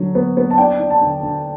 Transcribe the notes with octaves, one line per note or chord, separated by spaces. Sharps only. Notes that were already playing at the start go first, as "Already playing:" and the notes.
Already playing: D3 F#3
B3
B3
A5
D4 G5
D4
A5
D3
D3